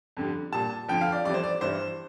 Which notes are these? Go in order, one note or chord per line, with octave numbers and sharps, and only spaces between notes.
F2 D3 G3
A#2 G3 A5
F2 D3 F3 G5
F5
D5
F2 E3 G3 D5
C5
D5
G2 E3 G3 C5